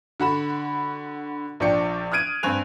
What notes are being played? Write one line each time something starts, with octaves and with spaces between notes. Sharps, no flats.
D3 F#4 B5 E7
A#1 F3 D4 D5 G5 C#7
D#6 F6 F#6 G#6 D7 D#7
G2 C4 G#5 F#6 F7